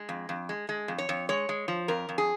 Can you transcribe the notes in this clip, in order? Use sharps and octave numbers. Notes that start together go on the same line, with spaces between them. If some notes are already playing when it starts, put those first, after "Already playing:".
Already playing: G#3
F2
F2
G#3
G#3
F2
C#5
F2
G#3 C#5
G#3
F3
F2 A#4
F2
G#4